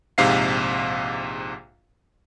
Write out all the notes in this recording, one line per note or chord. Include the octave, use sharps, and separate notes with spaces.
A#1 G#2 C3 F5 C7